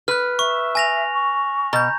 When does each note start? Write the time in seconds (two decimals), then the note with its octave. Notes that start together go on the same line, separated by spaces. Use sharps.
0.08 B4 F6 F#6
0.39 E5 C#6
0.75 G#5 A#6 F7
1.13 C#6
1.73 B2 A#5 G6